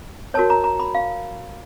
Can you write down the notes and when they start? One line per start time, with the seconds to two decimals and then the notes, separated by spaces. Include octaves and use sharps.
0.34 F#4 A#4 C#5 A5
0.50 A#5
0.64 A#5
0.80 B5
0.95 F5